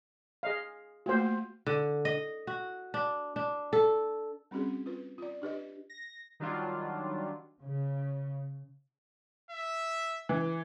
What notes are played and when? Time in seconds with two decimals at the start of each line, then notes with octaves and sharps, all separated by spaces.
0.43 G#4 D#5 F5
1.06 A3 A#3 F4 F#4 C5
1.67 D3
2.05 D#5
2.47 F#4
2.94 D4
3.36 D4
3.73 A4
4.51 G3 C4 C#4 F#4 G#4
4.86 F4 B4
5.18 F4 D5
5.42 D4 G4 B4 D#5
5.90 A#6
6.40 D#3 F#3 G3 D4 F4
7.61 C#3
9.50 E5
10.29 E3